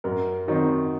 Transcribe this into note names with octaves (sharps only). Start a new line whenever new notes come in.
F#2 A#4
D#3 F#3 C4 D#4